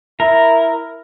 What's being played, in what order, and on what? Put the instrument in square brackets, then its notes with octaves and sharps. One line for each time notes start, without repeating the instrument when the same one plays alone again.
[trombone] E4 [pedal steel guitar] A#4